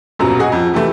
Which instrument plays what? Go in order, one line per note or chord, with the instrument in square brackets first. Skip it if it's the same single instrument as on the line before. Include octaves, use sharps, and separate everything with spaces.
[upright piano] D#1 F#2 B2 F#3 A#5
F#4 G#4 D#5
F2
C3 E3 A3